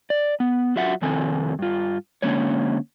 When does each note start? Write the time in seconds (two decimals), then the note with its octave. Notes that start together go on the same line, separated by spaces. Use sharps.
0.10 D5
0.40 B3
0.76 F#3 F4 F#4 E5 F#5
1.02 F2 C3 D#3 C4 A4 G#5
1.59 G2 F4
2.22 D3 G#3 A#3 C#4 D4 C#5